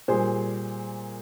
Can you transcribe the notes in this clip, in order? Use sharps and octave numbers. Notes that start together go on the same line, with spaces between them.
A#2 G3 G#4 C5